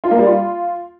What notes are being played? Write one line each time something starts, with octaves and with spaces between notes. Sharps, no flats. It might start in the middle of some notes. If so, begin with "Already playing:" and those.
F4
A#3
G3
F4